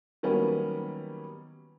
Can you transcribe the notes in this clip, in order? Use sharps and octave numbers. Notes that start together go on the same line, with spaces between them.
D#3 F#3 G3 A#3 B3 C#4